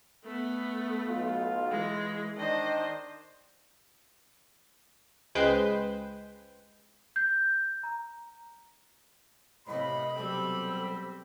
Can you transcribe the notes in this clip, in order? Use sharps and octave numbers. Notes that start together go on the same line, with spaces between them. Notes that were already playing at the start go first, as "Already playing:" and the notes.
A3 B3
B1 F4
E3 G#3
D#3 D4 C5 D#5
C#2 G#3 B4 C5 G5 G6
G6
A#5
A2 C3 A#3 D#5 B5
B2 F#3 G3 C4 A4